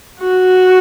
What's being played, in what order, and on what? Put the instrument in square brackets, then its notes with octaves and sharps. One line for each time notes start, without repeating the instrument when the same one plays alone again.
[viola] F#4